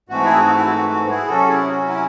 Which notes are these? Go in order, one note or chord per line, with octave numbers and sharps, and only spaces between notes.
G#2 E3 A3 C4 F#4
E4 G#4
F#4
E4
F#4
F#4
E4 G#4
C3 F#3 C#4 F#4 A4
E4 G#4
F#4
E4